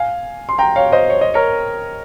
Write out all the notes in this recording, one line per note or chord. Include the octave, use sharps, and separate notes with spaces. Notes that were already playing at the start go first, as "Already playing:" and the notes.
Already playing: F5 G#5
C6
G5 A#5
C#5 F5
C5 D#5
C#5
D#5
A#4 C#5